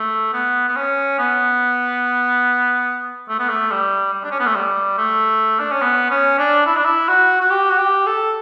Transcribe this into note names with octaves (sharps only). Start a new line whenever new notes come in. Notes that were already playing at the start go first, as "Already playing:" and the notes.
Already playing: A3
B3
B3
C#4
B3
A3
B3
A3
G3
G3
D4
C#4
B3
A3
G3
A3
D4
C#4
B3
C#4
D4
E4
D4
E4
F#4
F#4
G4
F#4
G4
A4